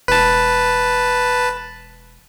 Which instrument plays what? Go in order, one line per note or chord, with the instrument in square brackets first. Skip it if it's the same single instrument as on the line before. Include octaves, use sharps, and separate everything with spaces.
[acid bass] E1 [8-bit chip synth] B4 A5